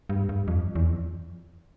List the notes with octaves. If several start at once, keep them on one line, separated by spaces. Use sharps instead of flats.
G2
G2
F2
E2
F2